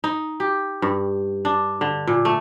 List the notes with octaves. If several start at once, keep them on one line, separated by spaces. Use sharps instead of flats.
D#4
G4
G2
D4
D3
A#2
A3